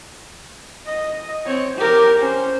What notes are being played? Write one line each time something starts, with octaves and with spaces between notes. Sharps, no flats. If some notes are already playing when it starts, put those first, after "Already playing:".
D#5
C4 C#5
G4 A#4
C#4 C5